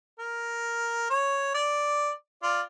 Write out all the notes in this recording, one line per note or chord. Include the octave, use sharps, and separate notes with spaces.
A#4
C#5
D5
F4 D5